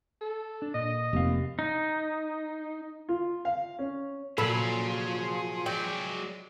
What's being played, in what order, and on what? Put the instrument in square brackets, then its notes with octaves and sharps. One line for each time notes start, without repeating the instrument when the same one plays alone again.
[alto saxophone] A4
[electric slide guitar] D4
[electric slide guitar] A#2 [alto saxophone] D#5
[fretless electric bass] F1 A#3 C4 [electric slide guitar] G4 F5
[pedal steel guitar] D#4
[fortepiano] F4
F5
C#4
[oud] A#2 F#3 [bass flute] F3 [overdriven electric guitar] G#4 F5 [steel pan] A4 B5 E6
[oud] F#3 [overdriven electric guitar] G#3 D5 [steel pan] G5